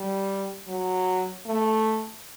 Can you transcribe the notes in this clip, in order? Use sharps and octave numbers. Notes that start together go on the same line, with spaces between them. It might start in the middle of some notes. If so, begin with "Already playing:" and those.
Already playing: G3
F#3
A3